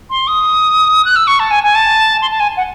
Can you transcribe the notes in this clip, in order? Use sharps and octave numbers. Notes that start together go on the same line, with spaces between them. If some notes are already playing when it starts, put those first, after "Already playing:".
C6
D#6
F#6
E6
C#6
A5
G#5
G#5
A5
C6
A5
G#5
F#5